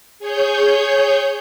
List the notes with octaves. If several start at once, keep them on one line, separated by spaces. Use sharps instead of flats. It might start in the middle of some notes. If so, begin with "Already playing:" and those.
G#4 C#5 G6